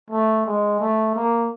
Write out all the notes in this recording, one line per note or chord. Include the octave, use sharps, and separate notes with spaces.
A3
G#3
A3
A#3